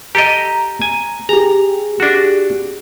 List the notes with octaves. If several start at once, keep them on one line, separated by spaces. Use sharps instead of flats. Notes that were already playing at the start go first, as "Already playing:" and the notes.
G4 A4 D#5 A#5
G#5
G4 G#4 A#5
D4 F#4